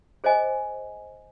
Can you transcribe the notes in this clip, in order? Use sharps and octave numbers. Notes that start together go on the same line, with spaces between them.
G#4 C5 D#5 G#5